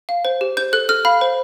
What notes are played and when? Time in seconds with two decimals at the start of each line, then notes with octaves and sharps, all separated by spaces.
0.09 F5
0.25 C5
0.41 G4
0.57 C5 G6
0.73 A4 F#6
0.89 A4 F6
1.05 F5 B5
1.21 C5